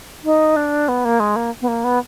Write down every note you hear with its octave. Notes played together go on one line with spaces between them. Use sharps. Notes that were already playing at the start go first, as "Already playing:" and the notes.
D#4
D4
B3
A#3
G#3
A#3
B3
A#3
B3